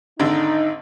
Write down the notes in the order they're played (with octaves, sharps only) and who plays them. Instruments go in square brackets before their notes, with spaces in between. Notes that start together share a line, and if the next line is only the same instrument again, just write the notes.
[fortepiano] G#1 D3 [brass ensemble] D#4